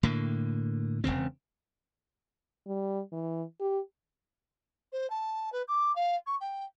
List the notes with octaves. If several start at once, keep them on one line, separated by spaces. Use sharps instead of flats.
A2 D3 A#3
E1 C#2 C#3 C4
G3
E3
G4
C5
A5
B4
D6
F5
C#6
G5